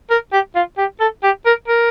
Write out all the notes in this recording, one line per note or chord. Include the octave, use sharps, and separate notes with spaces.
A#4
G4
F4
G4
A4
G4
A#4
A#4